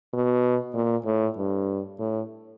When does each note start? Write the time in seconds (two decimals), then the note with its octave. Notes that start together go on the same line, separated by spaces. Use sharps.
0.13 B2
0.74 A#2
1.06 A2
1.37 G2
1.99 A2